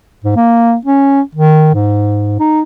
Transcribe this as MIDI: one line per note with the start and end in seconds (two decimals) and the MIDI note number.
0.24 0.36 44
0.36 0.75 58
0.86 1.21 61
1.35 1.70 51
1.74 2.35 44
2.40 2.61 63